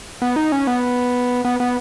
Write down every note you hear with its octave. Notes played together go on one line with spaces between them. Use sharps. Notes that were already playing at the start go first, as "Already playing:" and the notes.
B3
D#4
C#4
B3
B3
B3